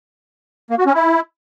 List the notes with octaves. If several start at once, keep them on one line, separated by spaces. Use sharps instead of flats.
A#3
F#4
C#4
E4